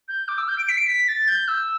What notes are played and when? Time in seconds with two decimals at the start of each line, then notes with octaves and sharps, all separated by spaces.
0.08 G6
0.28 D6
0.38 E6
0.48 G6
0.58 D7
0.69 B6
0.77 D7
0.86 B6
1.08 A6
1.28 G6
1.48 E6